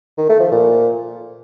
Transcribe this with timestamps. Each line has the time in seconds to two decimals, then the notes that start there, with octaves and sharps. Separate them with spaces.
0.18 D#3
0.29 A3
0.40 F3
0.51 A#2